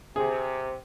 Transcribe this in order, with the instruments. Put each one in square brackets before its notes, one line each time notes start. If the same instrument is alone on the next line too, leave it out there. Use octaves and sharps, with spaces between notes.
[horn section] C3 [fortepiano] G#4